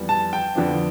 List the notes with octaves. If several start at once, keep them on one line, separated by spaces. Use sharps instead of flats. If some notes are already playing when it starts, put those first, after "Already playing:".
Already playing: F2 E3 G3 B3
A5
G5
F2 D3 F3 B3 D4